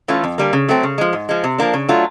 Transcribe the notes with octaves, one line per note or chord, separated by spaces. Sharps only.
E3 A3 C#4 F4
F2
D3 G3 A#3
C#3
F#3 A3 C4
C#3
F3 G#3
G#2
F3 G#3
C3
F3 A#3 D4
C#3
F#3 A3 D4 F4